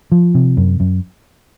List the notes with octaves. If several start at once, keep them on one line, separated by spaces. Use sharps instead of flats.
F3
C3
F#2
F#2